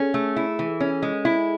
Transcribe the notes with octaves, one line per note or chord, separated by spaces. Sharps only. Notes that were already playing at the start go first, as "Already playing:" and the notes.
Already playing: C#4 G#4 A4
A3
E4
E3
C#4
G#3
E4